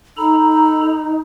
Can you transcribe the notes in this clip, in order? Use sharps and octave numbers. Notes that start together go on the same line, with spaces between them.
D#4 A4 A#5 B5